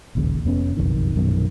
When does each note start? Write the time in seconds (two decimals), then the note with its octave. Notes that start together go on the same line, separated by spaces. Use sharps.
0.15 E1 A#1 D#2 C#3
0.44 F1 F2 B3 C#4
0.77 F#1 B1 F2 D#3
1.15 A#1 F#2 B2 D#3